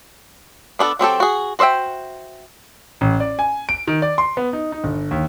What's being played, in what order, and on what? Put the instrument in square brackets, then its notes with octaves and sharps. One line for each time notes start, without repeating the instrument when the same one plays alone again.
[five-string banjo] B3 D4 G#4 A4
F#3 C4 G4 A4
F#4 G#4
F#4 C5 D5 E5 G5
[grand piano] A1
D5
G#5
D7
D#3
D5
C6
B3
D#4
D#4
G1
D#2